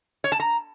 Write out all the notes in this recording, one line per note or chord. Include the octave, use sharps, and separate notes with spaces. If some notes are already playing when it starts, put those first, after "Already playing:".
C#5
A5
A#5